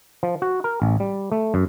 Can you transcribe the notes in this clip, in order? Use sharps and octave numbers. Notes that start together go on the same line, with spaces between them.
F3
F#4
A#4
A1
G3
A3
F#2